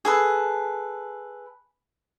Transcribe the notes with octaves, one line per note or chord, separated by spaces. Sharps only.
G#4 A4 B4